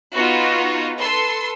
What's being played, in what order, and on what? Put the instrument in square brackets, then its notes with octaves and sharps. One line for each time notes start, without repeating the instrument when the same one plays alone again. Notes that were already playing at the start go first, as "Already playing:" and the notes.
[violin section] B3 D#4 F4 F#4
A4 B4 C6 E6